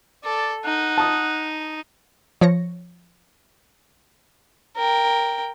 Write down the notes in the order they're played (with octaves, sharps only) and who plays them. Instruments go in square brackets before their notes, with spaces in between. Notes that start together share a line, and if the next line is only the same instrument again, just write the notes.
[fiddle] A4 [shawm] D5
[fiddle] D#4 [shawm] F#5
[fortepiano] A5 D#6
[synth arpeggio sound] F3 C#5 A#6 C#7
[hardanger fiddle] A#4 G5